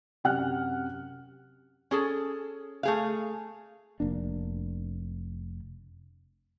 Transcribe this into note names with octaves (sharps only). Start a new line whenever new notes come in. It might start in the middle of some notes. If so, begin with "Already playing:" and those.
F#2 C3 F#5 F6 F#6
C#4 G#4 A4
A3 G#4 F5
F1 A#3 D4